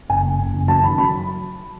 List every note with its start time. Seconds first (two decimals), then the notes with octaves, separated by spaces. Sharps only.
0.09 F#1 G#5
0.24 F#1
0.39 F#1
0.53 F#1
0.68 F#3 A5
0.83 D#3 B5
0.98 F#3 B5